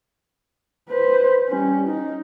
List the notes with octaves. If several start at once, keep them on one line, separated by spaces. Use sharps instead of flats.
B4 C5
G3 C#4
D#4